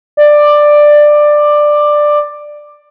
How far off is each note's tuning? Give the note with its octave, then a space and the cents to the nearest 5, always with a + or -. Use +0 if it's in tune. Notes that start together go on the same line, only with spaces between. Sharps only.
D5 +10